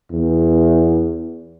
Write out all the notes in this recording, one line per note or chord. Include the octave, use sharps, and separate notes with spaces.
E2